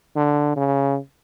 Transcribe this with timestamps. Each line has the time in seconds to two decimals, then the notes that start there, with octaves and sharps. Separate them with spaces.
0.16 D3
0.56 C#3